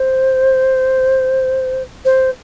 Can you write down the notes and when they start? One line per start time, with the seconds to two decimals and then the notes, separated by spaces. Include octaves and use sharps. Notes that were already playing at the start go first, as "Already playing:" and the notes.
Already playing: C5
2.05 C5